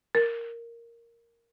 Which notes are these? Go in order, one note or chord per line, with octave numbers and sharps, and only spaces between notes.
A#4